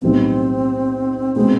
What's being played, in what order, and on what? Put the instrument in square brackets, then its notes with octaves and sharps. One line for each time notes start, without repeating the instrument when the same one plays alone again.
[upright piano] B1 A2 E3 G3 B3 [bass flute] C4
[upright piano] B2 G#3 B3 [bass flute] C4